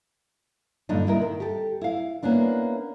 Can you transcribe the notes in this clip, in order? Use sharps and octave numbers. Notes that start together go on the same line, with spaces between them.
G2 A#2 D3 D4 D#4
D#2 E4 A#4
D#3
G4 A4
E4 F5
A#3 B3 C#4 D4 E4